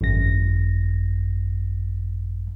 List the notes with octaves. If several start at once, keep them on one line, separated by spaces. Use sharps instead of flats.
G#1 F#2 A#6